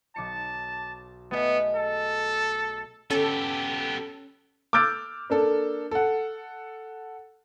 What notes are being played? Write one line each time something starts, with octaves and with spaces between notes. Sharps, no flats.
B1 A5 D6 C#7
A3 B3 G#4 D#5
A4
B3 C#4 G4 A4
D6 E6 F6 G6 A6 D7
A#3 D4 A4
A4 F#5